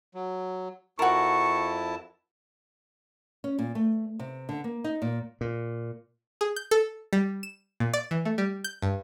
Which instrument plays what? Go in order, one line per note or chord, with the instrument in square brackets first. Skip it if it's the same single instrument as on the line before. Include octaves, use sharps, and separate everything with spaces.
[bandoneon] F#3
[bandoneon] F2 E4 A5 [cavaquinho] F#4 A#4 [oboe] C#6
[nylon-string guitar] C#4
A#2
A3
C3
D3
A#3
D#4
A#2
[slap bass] A#2
[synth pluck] G#4
G6
A4
G3
E7
A#2
D5
E3
A3
G3
G6
G2